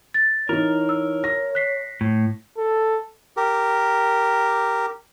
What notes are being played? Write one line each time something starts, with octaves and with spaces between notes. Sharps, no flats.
A6
E3 D#4 A#4 C#5
E6
A#6
F#6 B6 C7
A2
A4
G4 A#4